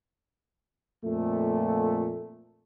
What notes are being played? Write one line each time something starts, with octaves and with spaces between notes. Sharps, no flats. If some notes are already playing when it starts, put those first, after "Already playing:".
F2 A#2 A3